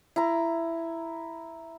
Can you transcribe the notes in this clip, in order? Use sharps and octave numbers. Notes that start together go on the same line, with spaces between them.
E4 A#5